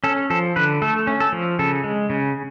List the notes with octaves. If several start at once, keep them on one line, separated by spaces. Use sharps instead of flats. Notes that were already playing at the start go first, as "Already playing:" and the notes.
C#4 A4
F3 A4
D3 B4
A3 A4
C#4
A4
F3
C#3 A4
G#3
C#3